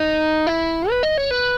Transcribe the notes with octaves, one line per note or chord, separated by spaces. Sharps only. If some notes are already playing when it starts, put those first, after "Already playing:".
Already playing: D#4
E4
B4
D#5
C#5
B4